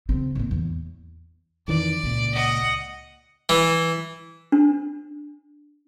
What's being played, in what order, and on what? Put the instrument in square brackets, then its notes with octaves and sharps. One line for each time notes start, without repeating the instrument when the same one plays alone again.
[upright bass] C#3 C4
A2 A#3
E2
[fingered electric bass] F2 D#3 E3 [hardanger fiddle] D5
[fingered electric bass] C#2 A#2
[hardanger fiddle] D#5 F#5
[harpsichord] E3
[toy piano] D4